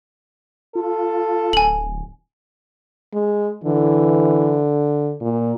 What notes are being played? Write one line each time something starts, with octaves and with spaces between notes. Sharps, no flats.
F4 A4
D1 G#5 F#7
G#3
D3 E3
A#2